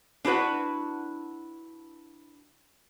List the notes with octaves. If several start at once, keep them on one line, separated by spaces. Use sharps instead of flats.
D4 E4 F#4 B4 F#5